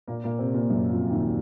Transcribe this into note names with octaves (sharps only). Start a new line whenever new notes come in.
A#2 A#3
A#2 A#3
C3 C4
A#2 A#3
F#2 F#3
F2 F3
D#2 D#3